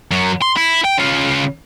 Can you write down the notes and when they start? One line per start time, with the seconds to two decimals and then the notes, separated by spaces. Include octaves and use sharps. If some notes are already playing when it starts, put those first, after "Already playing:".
0.11 F#2 F#3
0.42 C6
0.57 E4
0.84 G5
0.98 C#3 F4